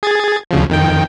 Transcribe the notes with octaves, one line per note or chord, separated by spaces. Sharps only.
G#4 G#6 A6
D2 C#3 F3
F2 D#3 G5